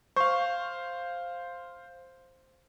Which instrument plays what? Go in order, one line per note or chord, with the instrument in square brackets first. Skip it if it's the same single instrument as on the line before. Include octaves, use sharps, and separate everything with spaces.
[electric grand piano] C5 F5 [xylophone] C#6